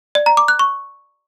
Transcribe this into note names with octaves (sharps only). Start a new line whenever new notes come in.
D5
A#5
D6
F#6
C#6